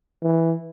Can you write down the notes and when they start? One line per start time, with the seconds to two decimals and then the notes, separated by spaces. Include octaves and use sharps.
0.22 E3